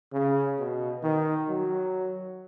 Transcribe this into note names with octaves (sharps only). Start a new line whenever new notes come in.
C#3
B2
D#3
F#3